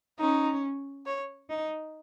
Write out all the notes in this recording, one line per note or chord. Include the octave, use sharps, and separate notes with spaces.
C#4 D#4
C#5
D#4